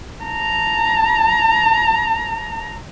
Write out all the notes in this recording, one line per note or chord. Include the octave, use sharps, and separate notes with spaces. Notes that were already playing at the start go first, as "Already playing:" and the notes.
A5 A#5